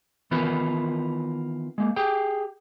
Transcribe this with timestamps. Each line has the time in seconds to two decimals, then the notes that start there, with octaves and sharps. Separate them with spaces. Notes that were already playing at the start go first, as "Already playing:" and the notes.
0.31 D#3 E3 B3 F4 A#4 B4
1.78 G#3 A#3
1.96 G4 G#4 G5